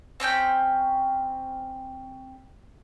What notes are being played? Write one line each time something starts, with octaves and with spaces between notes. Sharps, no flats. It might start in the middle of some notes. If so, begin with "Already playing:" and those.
C4 C#4 G5 G6